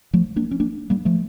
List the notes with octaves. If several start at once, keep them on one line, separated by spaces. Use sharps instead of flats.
F3 A3
A#3 D4
C#4
A#3 D4
G3 A#3
F3 A3